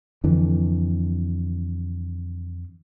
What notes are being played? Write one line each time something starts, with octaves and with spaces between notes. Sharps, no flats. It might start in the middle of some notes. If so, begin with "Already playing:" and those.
F2 D3 E3